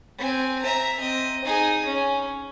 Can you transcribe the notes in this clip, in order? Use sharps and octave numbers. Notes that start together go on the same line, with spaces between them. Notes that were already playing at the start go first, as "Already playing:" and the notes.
C4 G#5
E5 A#5
C4 D#5
D#4 G#4
C#4